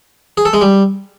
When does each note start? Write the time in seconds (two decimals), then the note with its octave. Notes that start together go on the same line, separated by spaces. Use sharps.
0.37 G#4
0.45 A4
0.53 G#3
0.61 G3